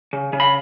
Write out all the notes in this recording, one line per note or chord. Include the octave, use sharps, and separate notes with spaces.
C#3
C#3
B5